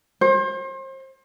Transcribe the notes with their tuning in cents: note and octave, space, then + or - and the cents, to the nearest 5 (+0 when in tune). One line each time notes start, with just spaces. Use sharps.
C5 +35